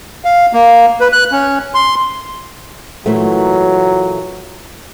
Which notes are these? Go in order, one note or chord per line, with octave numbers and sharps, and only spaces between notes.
F5
A#3
B4
F#6
C#4
C6
A#2 E3 F#3 A3